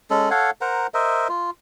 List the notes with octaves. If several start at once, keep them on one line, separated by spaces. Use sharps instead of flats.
G#3 C#4 A4
A4 C#5 F5 F#5
A#4 C5 F#5 A#5
A#4 C5 D#5 E5
F4